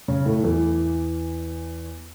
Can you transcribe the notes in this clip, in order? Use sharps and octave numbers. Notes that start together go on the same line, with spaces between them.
C#3 C#4
A2 A3
E2 E3